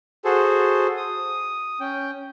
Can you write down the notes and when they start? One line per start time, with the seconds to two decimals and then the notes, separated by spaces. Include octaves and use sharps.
0.25 F#4 G#4 A4 C5
0.97 D#6
1.80 C#4 G5